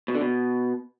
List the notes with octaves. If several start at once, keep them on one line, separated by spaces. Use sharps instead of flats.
B2
D3
B2